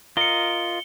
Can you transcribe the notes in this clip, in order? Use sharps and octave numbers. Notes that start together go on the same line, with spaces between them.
F4 A#4 D#5 C#7 G7